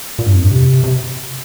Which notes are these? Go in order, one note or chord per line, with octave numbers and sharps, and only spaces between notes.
A#2
G2
F2
G2
C3
C3